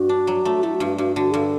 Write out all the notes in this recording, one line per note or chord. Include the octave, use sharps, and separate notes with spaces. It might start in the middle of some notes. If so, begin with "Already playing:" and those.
Already playing: G2 F#4
D4
F#3
A3
A3 E4
F#4
G2
F#4
G2 F#4
D3 F#4
G2 A4